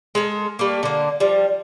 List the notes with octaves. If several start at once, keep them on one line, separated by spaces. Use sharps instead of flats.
G#3 A4 A#4
G3 A3 A#3
D3 A#3
F3 G3